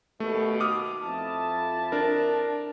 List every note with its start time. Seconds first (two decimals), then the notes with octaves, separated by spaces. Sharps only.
0.20 D#2 B2 A3
0.60 D6 D#6 F6
1.02 F2 E4 A5
1.92 D4 A#4